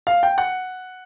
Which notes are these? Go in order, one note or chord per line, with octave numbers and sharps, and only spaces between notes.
F5
G5
F#5